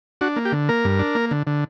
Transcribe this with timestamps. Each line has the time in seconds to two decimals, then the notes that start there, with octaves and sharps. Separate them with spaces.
0.21 D4 F#4
0.36 A#3
0.45 G4
0.52 D3
0.69 A#3 A#4
0.85 G2
0.99 D4
1.15 A#3
1.31 D3
1.47 D3